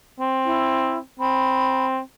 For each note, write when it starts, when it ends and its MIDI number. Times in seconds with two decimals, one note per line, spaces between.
0.20 1.01 60
0.45 0.98 64
1.19 2.00 60
1.19 1.85 83